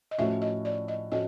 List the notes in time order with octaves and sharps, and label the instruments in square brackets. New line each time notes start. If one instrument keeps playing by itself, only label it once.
[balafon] D#5
[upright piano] A2 F3 A3 C#4 F#4 [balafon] E5
[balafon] D#5
D5
D#5
[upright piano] A2 F3 A3 C#4 F#4 [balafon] D#5